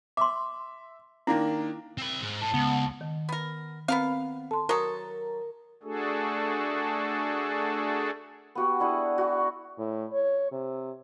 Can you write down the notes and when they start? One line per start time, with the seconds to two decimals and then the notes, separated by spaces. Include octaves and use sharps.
0.17 E5 C6 D6
1.27 D#3 A#3 D4 E4
1.98 C4 B5
2.21 G#2
2.41 A2 A5
2.54 C#2 B3
3.01 D#3
3.29 B3 A#4
3.88 B3 C4 A#4 F5
4.51 A4 A5 C6
4.69 F#3 A4 A#4 A#5 C#6 D#6
5.83 A3 D4 F#4 G#4 A4
8.55 B3 F#4 G4
8.80 D4 E4 G#4 F#5
9.18 F#4
9.78 A2
10.13 C#5
10.52 C3